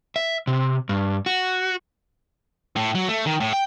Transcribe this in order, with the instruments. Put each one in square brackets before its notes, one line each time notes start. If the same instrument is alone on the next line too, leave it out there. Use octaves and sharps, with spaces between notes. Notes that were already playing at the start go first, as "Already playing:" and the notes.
[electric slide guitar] E5
C3
G2
F#4
[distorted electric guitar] A2
F#3
A3
D#3
A2
G5